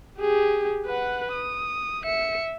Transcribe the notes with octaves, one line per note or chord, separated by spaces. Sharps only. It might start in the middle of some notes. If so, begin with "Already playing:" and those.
G4 G#4
B4 F#5
D#6
E5 C#7